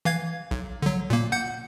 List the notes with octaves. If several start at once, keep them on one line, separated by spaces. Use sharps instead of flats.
E3 F5 G#6
B1
D3 F#3
A#2 A#3
F#5 G6 C#7